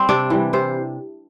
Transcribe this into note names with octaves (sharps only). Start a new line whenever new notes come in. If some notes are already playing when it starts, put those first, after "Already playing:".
Already playing: G3 C4 C5
C3 D4 D5
E3 G3
C3 C5